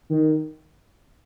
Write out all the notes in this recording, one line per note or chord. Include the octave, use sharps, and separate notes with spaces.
D#3